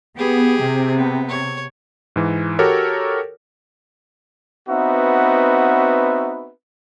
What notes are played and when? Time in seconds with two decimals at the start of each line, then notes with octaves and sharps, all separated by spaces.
0.17 B3 G4 G#4
0.60 C3
0.96 B3
1.29 C#5
2.16 G#2 E3
2.59 F#4 G4 A4 A#4 C#5
4.69 B3 C4 D#4 F#4 B4 E5